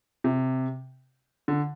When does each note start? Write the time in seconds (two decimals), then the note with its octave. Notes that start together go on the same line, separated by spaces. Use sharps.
0.24 C3
1.48 D3